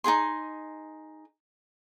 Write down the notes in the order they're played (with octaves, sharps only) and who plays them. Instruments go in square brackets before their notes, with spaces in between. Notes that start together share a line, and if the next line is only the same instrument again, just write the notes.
[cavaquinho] D#4 F4 G#4 C6